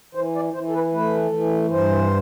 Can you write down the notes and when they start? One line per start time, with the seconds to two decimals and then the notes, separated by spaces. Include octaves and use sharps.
0.15 E3 C5
0.35 D5
0.54 E3 C5
0.68 A4
0.74 B4
0.92 A3 B4
1.33 E3
1.70 G2 C5